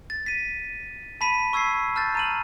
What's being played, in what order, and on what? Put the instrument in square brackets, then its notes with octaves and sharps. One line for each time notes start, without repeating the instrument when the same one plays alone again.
[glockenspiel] A6
B6 D#7
A5 B5 B6 D#7
C#6 E6 G#6 B6 C7
A5 F6 G6 A6
A#5 D#7 F#7